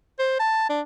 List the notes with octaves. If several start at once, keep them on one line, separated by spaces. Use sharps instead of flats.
C5
A5
D4